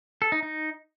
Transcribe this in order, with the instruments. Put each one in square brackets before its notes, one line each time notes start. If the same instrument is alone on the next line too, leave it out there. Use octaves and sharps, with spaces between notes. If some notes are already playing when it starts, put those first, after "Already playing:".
[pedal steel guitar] A4
D#4
D#4